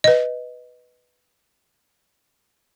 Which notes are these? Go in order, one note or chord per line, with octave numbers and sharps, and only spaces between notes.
B4 D#5